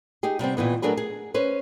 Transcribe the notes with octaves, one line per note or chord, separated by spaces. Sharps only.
D#4 G4 G#4
C3 G3 B3 C4
A#2 D#3 E3 B3
F#3 A3 D4 G#4 A#4 B4
G#4
C#4 B4 C5